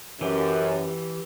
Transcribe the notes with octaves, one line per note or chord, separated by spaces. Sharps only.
F#2 E3 G4